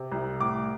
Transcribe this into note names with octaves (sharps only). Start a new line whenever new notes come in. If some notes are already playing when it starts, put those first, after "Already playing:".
Already playing: C3
C2
A2 D6